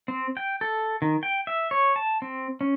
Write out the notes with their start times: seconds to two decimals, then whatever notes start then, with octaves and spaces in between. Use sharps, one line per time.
0.08 C4
0.37 G5
0.61 A4
1.02 D#3
1.23 G5
1.47 E5
1.71 C#5
1.96 A5
2.22 C4
2.61 C#4